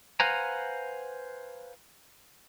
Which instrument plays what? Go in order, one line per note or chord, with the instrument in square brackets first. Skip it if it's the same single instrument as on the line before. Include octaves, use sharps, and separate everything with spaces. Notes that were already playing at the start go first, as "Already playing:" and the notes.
[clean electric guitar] B4 C5 F5 F#5 G#5 A#5